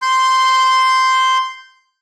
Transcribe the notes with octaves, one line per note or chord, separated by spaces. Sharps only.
C6 G6